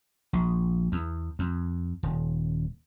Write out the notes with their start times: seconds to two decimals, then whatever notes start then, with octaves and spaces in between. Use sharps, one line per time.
0.33 A#1
0.92 E2
1.39 F2
2.03 D#1